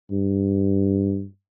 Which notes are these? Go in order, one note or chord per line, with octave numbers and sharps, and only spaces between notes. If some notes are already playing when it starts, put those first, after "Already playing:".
G2